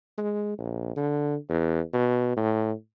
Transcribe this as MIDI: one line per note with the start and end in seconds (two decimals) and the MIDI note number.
0.18 0.56 56
0.58 0.95 34
0.96 1.36 50
1.49 1.81 40
1.94 2.34 47
2.37 2.72 45